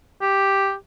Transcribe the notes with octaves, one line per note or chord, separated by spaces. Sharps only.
G4